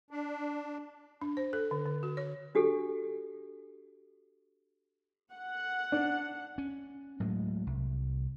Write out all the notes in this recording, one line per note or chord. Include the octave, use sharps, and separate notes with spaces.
D4
D4
C5
A4
D3
D3
F#4
C#5
D4 F#4 G4 A4
F#5
D4
C#4
A2 F#3 G#3
C2